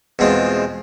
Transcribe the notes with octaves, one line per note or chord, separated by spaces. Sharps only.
E2 B2 G#3 C4 F4